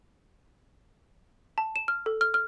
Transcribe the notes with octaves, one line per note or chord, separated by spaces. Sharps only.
A5
E7
F6
A4
F6
F6